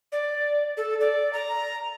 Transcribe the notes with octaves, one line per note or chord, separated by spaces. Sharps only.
D5
A4
D5
A#5